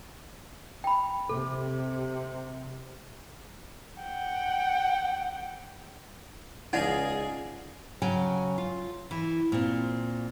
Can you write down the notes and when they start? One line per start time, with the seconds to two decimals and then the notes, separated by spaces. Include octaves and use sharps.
0.84 G5 B5
1.29 C3 A4
4.02 F#5 G5
6.73 C#2 D#4 G#4 D5 D#5 F5 F#5
8.02 C#3 F#3 G5 G#5
8.58 F4
9.11 E3
9.52 A#2 C4